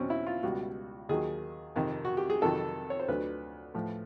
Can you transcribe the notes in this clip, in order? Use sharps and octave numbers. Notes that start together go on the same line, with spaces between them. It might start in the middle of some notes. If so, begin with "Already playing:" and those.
Already playing: E2 B2 F#3 C4 C#4
E4
F4
C#2 B2 G3 F#4
D#2 D#3 F#3 G#4
F2 C3 D#3
F#4
G4
G#4
F2 C3 D#3 F#3 A4
C#5
C5
D2 D3 F#3 B4
A2 F3